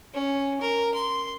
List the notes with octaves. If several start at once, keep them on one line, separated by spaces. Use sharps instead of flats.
C#4
A#4
C6